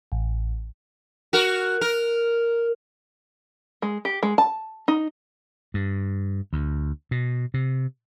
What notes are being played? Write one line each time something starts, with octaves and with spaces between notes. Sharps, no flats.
A1
F#4 A#4
A#4
G#3
G4
G#3
A5
D#4
G2
D2
B2
C3